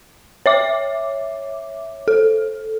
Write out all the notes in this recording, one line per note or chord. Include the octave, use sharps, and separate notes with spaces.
C#5 E5 D6
A4